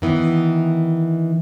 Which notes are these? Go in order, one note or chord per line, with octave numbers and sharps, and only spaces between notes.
D#3 E3 B3